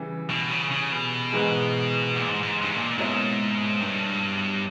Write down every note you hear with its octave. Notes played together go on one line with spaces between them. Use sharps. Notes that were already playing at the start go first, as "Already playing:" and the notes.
Already playing: C#3 E3 G3
B2
C#3
C#3
B2
G#2 E3 G#3
A#2
G#2
G#2
G2
G#2
A#2
G#2 B2 A#3 C#4 E4
G2